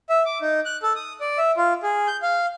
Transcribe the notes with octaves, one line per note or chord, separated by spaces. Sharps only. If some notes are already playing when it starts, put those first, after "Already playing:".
E5
D6
D#4
F#6
A4
D#6
D5
E5
F4
G#4
G6
F5